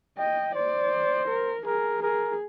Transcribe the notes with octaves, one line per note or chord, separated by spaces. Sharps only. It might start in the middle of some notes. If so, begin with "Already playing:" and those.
D#5 G5
C5 D5
A#4
G#4 A#4
G#4 A#4